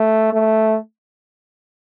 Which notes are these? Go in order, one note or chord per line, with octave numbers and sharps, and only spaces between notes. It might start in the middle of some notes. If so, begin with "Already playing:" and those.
Already playing: A3
A3